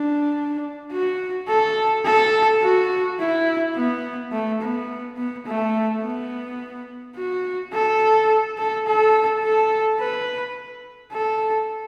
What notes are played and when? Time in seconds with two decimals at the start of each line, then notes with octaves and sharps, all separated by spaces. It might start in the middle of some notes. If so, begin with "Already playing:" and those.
Already playing: D4
0.92 F#4
1.48 A4
2.05 A4
2.62 F#4
3.19 E4
3.76 B3
4.32 A3
4.61 B3
5.17 B3
5.46 A3
6.02 B3
7.16 F#4
7.73 A4
8.58 A4
8.86 A4
9.42 A4
10.00 B4
11.13 A4